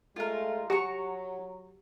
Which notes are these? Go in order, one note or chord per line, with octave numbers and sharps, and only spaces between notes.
G#3 A3 F4 A#4
F#3 F#4 G4 G#5 A#5 C#6 D#6